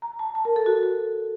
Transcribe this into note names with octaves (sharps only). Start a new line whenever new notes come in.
A#5
A5
A5
A#4
A4
F#4
A4